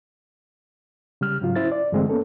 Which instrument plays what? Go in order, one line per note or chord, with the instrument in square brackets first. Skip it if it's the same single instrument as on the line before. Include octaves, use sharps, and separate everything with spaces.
[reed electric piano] C#3 G3 F6
G#2 C#3 F#3 F4
C#4 E4 C5 A6
D5
G2 D3 E3 G#3 A3 C4
A#3 B3 C#4 A4